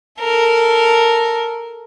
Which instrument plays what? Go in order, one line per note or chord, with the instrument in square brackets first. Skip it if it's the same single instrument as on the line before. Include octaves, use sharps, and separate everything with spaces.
[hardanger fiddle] A4 A#4